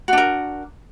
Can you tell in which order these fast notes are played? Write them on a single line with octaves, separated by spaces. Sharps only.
F#4 D4 A#4